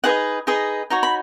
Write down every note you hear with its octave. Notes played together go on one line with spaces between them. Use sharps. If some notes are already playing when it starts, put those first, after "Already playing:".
D#4 G#4 B4 D#5 F#5
D#4 G#4 B4 D#5
D#4 F#4 C#5 A#5
B5